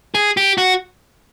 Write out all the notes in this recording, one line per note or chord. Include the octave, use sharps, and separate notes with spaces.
G#4
G4
F#4